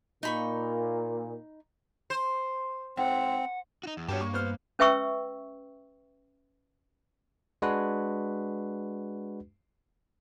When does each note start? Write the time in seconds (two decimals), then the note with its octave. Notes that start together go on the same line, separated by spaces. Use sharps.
0.23 A#2 D#4 B5 C#6
2.10 C5
2.97 G#2 C4 F#5
3.83 D#4 F#4
3.97 E2
4.08 G2 B3 F#4 G4 C#5 A5
4.21 A#3 C#6
4.33 B3 C5 F6
4.79 C#4 B4 E5 G5 C#6 E6
7.62 G#3 D4 F#4 B4